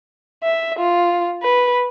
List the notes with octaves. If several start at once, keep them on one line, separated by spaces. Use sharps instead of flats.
E5
F4
B4